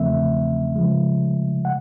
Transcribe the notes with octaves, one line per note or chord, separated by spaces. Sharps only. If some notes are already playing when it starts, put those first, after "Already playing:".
Already playing: E2 C#3 F3 A3 C4 E5
C#3 F3 G#3
F#5